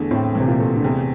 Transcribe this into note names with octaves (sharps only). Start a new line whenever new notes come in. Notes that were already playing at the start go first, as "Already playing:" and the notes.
Already playing: E2 D3 E3 A3
A2 C4
C3 E3
A#2
A3
D3
E2 C3